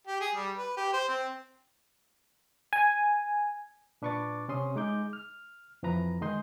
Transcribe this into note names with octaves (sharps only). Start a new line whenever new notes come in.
G4
G#4
G3
B4
G4
C5
C4
G#5
A#2 D4 B4 C#6 D6 A6
C3 C#4 C6 D#6
G#3 D#4 D6 G6
F6
F2 E3 F3 B4 A#5
D#3 G#3 D#5 C6 G6